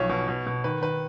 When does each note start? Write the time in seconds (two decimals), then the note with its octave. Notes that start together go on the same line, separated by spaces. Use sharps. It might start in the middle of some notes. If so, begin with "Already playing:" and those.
Already playing: B1 F3 C#5
0.09 B2
0.28 B2
0.47 B2
0.64 D#3 B4
0.81 D#3 B4